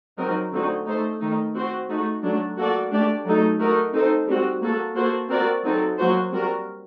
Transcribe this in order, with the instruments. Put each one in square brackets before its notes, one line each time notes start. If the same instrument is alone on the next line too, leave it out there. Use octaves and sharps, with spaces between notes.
[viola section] F#3 C4 D#4 F#4 A#4
D3 A3 C4 D#4 F#4
A3 D#4 A4 C5
D#3 A3 D#4
C4 F#4 C5
A3 D#4 F#4
F#3 A3 D4
A#3 F#4 A4 D5
A3 D4 G4 D5
F#3 A3 D#4 A4
A3 D#4 F#4 A#4
C4 D#4 A4 C5
G3 C4 F#4
A#3 F#4 A4
A#3 F#4 A4 C5
C4 F#4 A#4 D5
F#3 C4 D#4 A4
F#3 A#3 F#4 C5
G3 C4 F#4 A#4